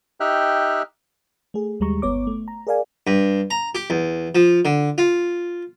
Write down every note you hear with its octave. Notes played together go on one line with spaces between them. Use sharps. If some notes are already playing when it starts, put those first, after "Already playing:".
D#4 G4 E5 G5 F6 F#6
A3 G#4
D#2 G3 G#3 A#5 C#6
G1 B3 C#5 D6
A3
A#5
G#4 A#4 D5 F5 G#5
G2
A#5
G4
E2
F3
D3
F4